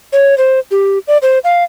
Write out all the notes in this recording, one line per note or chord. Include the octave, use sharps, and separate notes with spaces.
C#5
C5
G4
D5
C5
F5